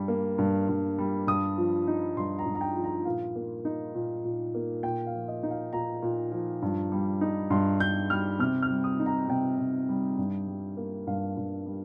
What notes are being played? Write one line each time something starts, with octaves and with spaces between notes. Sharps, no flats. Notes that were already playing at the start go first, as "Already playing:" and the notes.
Already playing: G2 G3
A#3
G2
G2
G3
G2 D#6
F3
D#4
G2 C6
A#5
G2
A#5
G5
F3
A#5
A#2 F5
A#3
D#4
A#2
A#2
A#3
A#2 G5
F5
F3
D#5
D#4
F5
A#2 A#5
A#2
F3
G2
G3
D#4
G2 C6
G2 G6
G3 F6
C3 F6
F6
G3
D#6
D#4
A#5
C3 G5
C3
G3
G2
G3
A#3
G2 F5
G2
G3